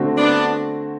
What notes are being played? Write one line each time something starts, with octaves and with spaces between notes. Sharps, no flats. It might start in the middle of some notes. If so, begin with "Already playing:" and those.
Already playing: D3 A3 C4 F#4
B3 D4